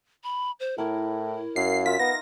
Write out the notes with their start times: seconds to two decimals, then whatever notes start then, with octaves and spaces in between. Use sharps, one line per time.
0.24 B5
0.60 C5
0.78 A2 E4 A#4 C#5
1.56 F#2 F5 C7
1.86 F4 E5 B6
1.99 B3 D#4 A#6